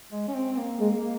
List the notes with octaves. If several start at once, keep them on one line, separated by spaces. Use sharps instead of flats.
G#3
C#4
C4
C4
A#3
G#3